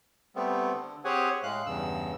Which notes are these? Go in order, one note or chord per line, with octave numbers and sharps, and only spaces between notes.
G3 A3 B3 C4
D3
C4 G4 G#4 C#5 F#5 G#5
A2 G#3 F5 F#6
E2 G2 C#3 E6